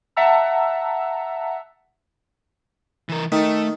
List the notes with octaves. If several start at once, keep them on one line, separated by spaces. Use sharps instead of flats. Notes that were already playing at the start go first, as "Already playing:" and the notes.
E5 F#5 A5 A#5 E6
E3 A#4
D#3 A3